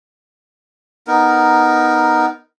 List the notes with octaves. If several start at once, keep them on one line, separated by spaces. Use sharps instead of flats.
B3 D#4 A#4